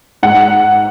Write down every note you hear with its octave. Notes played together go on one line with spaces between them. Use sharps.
G#2 F#5